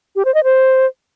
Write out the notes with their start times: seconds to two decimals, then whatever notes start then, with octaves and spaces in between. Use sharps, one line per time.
0.16 G4
0.25 C5
0.35 D#5
0.44 C5